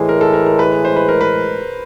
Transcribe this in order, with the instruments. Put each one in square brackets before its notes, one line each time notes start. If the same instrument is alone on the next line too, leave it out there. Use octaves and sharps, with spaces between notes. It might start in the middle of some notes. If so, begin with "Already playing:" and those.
Already playing: [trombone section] A2 E3 G#3 [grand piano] C5
[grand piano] A#4
A4
A#4
A#4
B4
C5
B4
A#4
B4